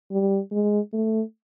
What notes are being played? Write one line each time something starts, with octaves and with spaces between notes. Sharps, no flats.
G3
G#3
A3